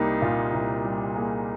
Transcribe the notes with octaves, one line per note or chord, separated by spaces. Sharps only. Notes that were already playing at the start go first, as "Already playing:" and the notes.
Already playing: C2 G3 A#3 D#4
A#2 F4
C2
G3
A#3 G#4